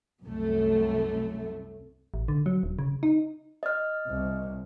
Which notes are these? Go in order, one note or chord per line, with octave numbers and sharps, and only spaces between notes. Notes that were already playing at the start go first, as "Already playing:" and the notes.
C2 F#2 A3
A1
D3
F#3
D#1
C#3
D#4
D#5 F6
C2